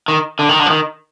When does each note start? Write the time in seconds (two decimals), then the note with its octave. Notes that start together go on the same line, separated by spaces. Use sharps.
0.08 D#3
0.39 D3
0.49 D#3
0.59 D3
0.66 F3
0.70 D#3